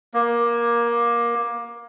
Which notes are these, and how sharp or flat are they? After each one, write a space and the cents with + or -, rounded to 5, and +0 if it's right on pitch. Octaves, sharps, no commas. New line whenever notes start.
A#3 +20